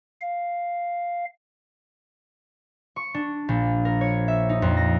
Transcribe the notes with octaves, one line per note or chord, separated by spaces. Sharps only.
F5
C#6
D4
A#1
A#4
C#5
E5
D#4
F2
A#6